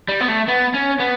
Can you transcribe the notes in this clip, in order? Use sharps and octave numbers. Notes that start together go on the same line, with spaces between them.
G3
B3
A3
B3
C#4
B3